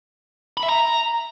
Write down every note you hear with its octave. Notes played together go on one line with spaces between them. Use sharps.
B5
E5
A#5